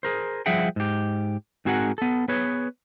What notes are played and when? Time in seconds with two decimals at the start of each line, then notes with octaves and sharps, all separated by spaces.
0.03 G#4 A#4 C5
0.46 F3 G3 G#4 E5 F#5 G5
0.76 G#2 G4
1.65 G#2 C4 F#4 G#4 A#4 F#5
1.98 B3 A4
2.28 B3 G#4 B4 C#5